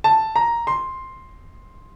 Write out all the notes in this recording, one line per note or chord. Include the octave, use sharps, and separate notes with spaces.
A5
A#5
C6